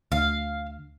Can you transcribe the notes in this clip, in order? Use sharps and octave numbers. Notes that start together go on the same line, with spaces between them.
D2 F5